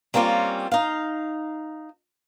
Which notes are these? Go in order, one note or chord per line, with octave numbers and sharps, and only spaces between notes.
G3 A#3 C4 C#4 F4
D#4 F5